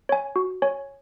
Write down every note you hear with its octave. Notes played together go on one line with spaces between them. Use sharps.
C#5 G#5
F#4
C#5 G#5